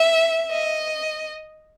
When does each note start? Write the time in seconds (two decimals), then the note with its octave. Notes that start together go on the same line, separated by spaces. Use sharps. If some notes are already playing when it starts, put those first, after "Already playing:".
Already playing: E5
0.52 D#5